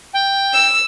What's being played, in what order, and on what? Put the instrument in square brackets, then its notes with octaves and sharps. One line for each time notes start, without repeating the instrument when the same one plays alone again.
[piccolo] G5
[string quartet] E6